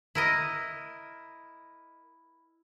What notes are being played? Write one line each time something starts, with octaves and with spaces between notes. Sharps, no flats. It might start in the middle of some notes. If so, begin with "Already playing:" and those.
E4 A#4 D#5